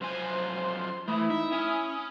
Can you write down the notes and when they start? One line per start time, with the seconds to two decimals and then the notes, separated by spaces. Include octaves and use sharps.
0.01 F#2 F3 C5 G#5 C6
1.08 E3 A3 E4 D#6
1.30 D#4 E5
1.52 C#4 G#5